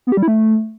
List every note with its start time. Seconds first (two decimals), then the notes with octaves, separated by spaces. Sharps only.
0.07 B3
0.12 G4
0.17 G3
0.23 E4
0.28 A3